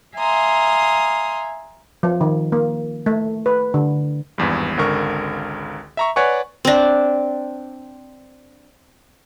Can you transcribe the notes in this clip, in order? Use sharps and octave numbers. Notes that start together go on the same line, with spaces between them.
E5 F5 G#5 A#5 C6 D#6
F3
D#3
A#3
A3
B4
D3
G#1 E2 G2
G#1 C#2 D3 A#4 C#6
E5 A#5 C#6
B4 C#5 D5 F#5 G#5 C#6
C4 D4